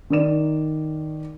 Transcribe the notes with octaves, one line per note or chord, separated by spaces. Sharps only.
D#3 A#4 D5 E7